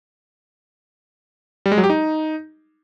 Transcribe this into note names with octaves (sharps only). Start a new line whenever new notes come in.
G3
G#3
F#3
G4
D#4